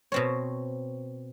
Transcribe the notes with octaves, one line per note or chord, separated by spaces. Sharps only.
B2 C4 C#5